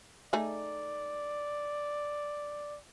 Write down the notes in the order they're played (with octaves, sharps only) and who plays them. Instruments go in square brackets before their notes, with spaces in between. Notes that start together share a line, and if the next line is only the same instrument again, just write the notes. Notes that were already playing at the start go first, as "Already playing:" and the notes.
[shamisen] A3 D#4 G#4 [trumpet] D5